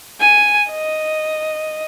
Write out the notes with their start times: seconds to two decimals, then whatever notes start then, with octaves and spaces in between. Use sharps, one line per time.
0.21 G#5
0.71 D#5